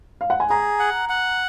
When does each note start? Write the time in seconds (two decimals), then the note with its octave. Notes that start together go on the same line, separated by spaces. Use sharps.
0.21 F5
0.30 F#5
0.40 G#5
0.50 G#4 A#5
0.80 F#5
1.09 F#5